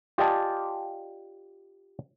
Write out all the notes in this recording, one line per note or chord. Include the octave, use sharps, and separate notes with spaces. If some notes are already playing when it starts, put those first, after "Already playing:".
F4 G4 D5 D#5 G#5 A5